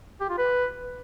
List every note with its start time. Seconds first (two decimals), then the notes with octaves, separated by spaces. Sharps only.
0.21 G4
0.30 F4
0.38 B4